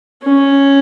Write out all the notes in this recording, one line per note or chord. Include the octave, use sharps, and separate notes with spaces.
C#4